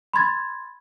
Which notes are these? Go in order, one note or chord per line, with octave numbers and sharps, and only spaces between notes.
B5 C6 G#6 A6